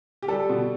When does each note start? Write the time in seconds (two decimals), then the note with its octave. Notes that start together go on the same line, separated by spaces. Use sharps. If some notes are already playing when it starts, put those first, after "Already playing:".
0.23 G4
0.28 G3 A4
0.49 B2